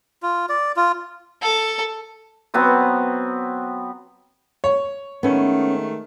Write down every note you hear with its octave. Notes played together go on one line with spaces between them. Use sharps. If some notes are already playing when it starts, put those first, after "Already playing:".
F4
D5
F4
A4
F#3 B3 C4 D#6
C#5
D#3 G#3 A3 B3 C#4